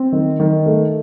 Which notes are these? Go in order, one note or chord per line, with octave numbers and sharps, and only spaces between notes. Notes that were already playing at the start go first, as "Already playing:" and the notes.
Already playing: C4
D#3
D#3
A3